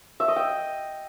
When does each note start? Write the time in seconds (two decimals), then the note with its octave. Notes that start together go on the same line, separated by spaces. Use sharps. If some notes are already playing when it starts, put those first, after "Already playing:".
0.20 E5
0.28 D#5
0.36 G5